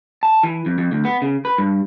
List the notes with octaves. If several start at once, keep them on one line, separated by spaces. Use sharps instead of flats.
A5
E3
F2
F2
D2
B3
C#3
B4
G2